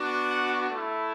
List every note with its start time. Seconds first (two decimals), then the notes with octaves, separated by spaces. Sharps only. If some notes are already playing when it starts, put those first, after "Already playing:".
Already playing: B3 D4 F#4
0.30 F#5
0.69 A3 E4